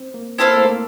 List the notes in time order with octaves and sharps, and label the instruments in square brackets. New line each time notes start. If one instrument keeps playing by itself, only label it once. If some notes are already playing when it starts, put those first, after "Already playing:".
Already playing: [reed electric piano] C4
A#3
[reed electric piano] C4 [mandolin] E4 A4 C5 F5
[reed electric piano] A#3
A3
A#3